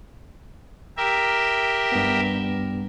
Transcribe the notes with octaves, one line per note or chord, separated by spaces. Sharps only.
G4 A#4 E5
G2 B3